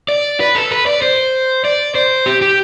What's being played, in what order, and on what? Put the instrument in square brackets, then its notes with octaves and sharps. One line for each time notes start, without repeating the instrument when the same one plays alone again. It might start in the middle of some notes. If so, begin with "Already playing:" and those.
[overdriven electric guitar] D5
B4
A4
B4
D5
C5
D5
C5
G4
G4